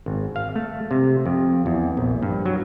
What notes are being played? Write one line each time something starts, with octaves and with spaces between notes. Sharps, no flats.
G#1
F5
A3
C3
F2
E2
A#1
G2
F#3